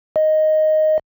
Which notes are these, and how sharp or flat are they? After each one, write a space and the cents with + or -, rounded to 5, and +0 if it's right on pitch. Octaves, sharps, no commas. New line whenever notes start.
D#5 +0